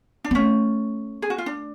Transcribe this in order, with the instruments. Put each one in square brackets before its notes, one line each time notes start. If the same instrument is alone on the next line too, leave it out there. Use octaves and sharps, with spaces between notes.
[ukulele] D4
[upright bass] B3
[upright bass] A3 [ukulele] C#4
[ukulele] G#4
F#4
F4
D4